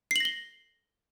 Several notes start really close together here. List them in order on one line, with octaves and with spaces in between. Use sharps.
C7 F#7 A#6 G7